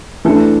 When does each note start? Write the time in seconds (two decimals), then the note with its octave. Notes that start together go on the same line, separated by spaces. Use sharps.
0.25 E3 A3 D4 A4